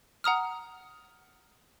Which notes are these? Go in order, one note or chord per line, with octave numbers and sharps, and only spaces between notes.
F#5 A#5 D#6 F6